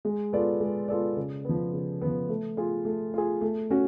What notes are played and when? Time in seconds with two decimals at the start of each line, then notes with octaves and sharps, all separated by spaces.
0.05 G#3
0.33 B3 F4 A4 D5
0.60 G#3
0.88 B3 F4 A4 D5
1.17 C#3
1.45 F3 B3
1.73 C#3
2.01 F3 B3
2.29 A3
2.57 F4 G#4
2.85 A3
3.14 F4 G#4
3.41 A3
3.70 C#4 F#4